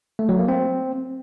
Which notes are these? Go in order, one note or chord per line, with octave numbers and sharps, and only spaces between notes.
A3
F#3
A#3
C4